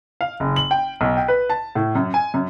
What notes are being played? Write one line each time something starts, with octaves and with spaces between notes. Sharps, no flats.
F5
F#1
F#7
G5
B1
G5
B4
A5
A2
F#2
G#5
F#2